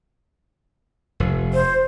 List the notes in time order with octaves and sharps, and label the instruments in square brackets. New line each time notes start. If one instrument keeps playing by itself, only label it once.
[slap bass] F1
[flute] C5